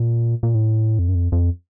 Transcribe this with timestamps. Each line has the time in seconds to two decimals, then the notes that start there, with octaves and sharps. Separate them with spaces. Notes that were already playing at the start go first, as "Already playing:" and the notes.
Already playing: A#2
0.43 A#2
0.55 A2
0.99 F2
1.09 F#2
1.15 F2
1.32 F2